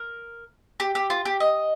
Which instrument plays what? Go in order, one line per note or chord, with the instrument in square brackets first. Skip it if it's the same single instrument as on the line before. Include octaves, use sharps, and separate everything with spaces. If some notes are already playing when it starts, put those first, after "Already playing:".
Already playing: [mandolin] A#4
G4
G4
F4
G4
D#5